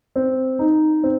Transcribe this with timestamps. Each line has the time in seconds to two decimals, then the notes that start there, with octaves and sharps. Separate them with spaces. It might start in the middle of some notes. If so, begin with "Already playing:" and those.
0.16 C4
0.59 D#4
1.03 C4